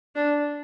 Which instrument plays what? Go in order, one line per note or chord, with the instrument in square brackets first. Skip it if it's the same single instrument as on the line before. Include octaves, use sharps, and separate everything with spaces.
[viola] D4